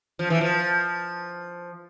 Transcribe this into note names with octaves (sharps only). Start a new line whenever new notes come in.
F3
E3
F3